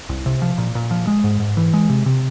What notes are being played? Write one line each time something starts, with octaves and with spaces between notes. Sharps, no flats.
C2
C3
F3
A#2
A#2
F3
G#3
G#2
G#2
E3
G#3
C3
C3